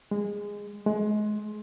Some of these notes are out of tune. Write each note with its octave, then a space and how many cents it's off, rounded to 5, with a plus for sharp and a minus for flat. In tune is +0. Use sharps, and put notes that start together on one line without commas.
G#3 -15
G#3 +25